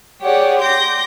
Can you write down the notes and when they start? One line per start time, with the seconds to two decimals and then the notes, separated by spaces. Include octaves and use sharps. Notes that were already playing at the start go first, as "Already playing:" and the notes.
0.21 G4 G#4 C#5 D5 F#5
0.60 C6 D6 G6 A#6